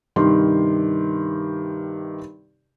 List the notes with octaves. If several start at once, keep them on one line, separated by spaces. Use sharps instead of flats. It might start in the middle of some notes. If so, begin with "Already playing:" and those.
G2 C3 D#3 G4 C6